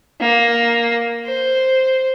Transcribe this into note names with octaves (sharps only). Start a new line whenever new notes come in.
A#3
C5